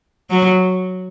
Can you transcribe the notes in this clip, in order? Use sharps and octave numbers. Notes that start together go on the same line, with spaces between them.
F#3